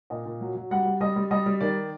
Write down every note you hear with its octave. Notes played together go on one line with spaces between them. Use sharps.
A#2 D#5
A#2
F#3
F#3
G3 F#5
G3
G3 D#5
G3
G3 D#5
G3
D#3 D5